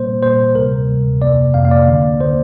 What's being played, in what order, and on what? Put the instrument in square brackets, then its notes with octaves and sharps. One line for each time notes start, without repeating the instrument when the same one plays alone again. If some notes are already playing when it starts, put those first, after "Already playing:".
Already playing: [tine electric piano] A#2 G3 A#3 C5
A#2 G3 A#3 C5
D2 C3 G3 A#4
D2 C3 G3
F2 C3 A#3 D5
F2 C3 A#3 F5
F5
D5
D2 D3 A#3
D3 A#3 C5